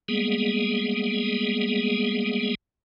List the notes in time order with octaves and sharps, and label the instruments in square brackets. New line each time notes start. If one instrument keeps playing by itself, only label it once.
[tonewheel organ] G3 G#3 A#3 B3 G#4